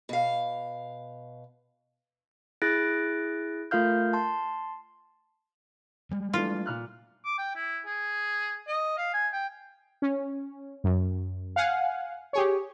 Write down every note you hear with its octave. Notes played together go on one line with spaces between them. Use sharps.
B2 F5
E4 G#4 F#6 A6 A#6 D7
A3 F4 A#4 F5 F6 G6
A5 C6
G3 G#3
E3 A3 D4 F4
A#2 F6 F#6
D6
G5
E4
G#4
D#5
F5
G#5
G5
C#4
F#2
F5 F#5 G#5
G4 G#4 C#5